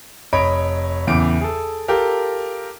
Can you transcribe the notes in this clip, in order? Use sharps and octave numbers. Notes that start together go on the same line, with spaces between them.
F1 C#5 D#5 B5 D7
E2 A2 C#3 D6 D7
G#4 A4
F4 G4 A4 A#4